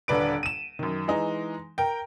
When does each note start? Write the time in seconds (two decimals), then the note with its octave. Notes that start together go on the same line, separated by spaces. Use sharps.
0.08 D#1 D3 D4 B4 D7
0.43 D#7 E7
0.79 F#2 D#3
1.08 E3 G#3 D#4
1.78 A#4 G5